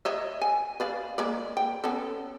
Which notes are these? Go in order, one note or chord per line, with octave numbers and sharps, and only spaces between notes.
C#5 D#5 E5
G#5
B4 D5 F5
G#3 A#3 D5
G5
B3 C#4 A4